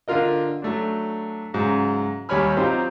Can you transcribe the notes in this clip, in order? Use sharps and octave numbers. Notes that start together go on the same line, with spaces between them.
D3 D4 F4 A#4 D#5
F#3 A3 D4
G#2 C#3 F#3
D#2 G3 C#5 G#5 B5 F6
F#3 C4 D#4 F4 G4 C5